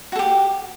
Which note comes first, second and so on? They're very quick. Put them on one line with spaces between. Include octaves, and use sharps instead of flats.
F#4 A4 G4